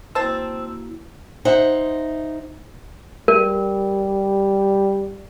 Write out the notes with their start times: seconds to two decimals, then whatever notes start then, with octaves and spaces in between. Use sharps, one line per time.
0.15 A#3 C4 E4 F#4 C5 A5 E6
1.45 D#4 C5 E5 F#5
3.28 G3 A#4